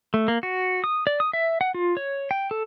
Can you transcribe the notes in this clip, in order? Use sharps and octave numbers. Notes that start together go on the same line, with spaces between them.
A3
A#3
F#4
D#6
D5
D#6
E5
F#5
F4
C#5
G5
A4